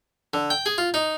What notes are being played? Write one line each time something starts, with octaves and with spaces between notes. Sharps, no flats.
D3
G5
G#4
F4
D#4